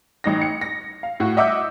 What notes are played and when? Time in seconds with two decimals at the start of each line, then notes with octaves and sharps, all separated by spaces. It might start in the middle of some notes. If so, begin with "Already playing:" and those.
0.24 A1 D#4 A#6
0.41 C#7
0.61 A#6
1.03 F5
1.20 A2 F#4
1.37 D#5 E5 F#5 D6 E6 G6